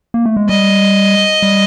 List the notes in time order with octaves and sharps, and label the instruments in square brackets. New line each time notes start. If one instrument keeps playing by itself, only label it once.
[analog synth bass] A#3
A3
G#3
[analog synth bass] G3 [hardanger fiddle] D#5
[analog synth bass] G3